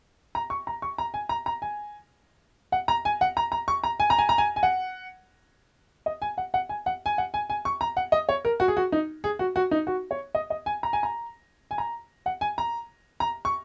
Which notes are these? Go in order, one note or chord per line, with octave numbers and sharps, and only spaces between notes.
A#5
C#6
A#5
C#6
A#5
G#5
A#5
A#5
G#5
F#5
A#5
G#5
F#5
A#5
A#5
C#6
A#5
G#5
A#5
G#5
A#5
G#5
G#5
F#5
D#5
G#5
F#5
F#5
G#5
F#5
G#5
F#5
G#5
G#5
C#6
A#5
F#5
D#5
C#5
A#4
F#4
G#4
F#4
D#4
G#4
F#4
F#4
D#4
F#4
C#5
D#5
D#5
G#5
A#5
G#5
A#5
G#5
A#5
F#5
G#5
A#5
A#5
C#6